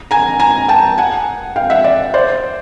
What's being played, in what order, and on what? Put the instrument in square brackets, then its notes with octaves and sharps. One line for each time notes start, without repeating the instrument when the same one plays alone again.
[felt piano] G#5 A#5
G#5 A#5
G5 A5
F#5 G#5
F5 G5
E5 F#5
D5 E5
C5 D5